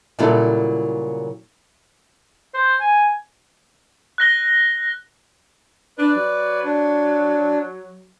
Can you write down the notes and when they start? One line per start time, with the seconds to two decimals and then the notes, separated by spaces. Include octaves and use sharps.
0.19 A#2 C#3 F#3 G3 E4 A4
2.54 C5
2.80 G#5
4.18 F#6 A#6 G7
5.98 D4 B4 D5
6.16 F#3
6.64 D4